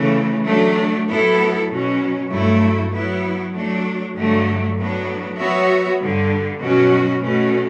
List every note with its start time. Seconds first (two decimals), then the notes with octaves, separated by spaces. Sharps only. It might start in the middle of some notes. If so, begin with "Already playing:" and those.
Already playing: C#3 E3 A3
0.46 F#3 A3 D4
1.08 A2 F#3 B3 E4 A4
1.69 B2 F#3 C#4
2.30 G2 F#3 A3 E4
2.91 F#3 B3 E4
3.53 F#3 A3 D4
4.14 G2 D3 F#3 A3
4.75 A2 F#3 B3 D4
5.37 F#3 B3 F#4 C#5 E5
5.99 G2 D3 G3
6.60 B2 F#3 C#4 F#4
7.21 B2 A3 C#4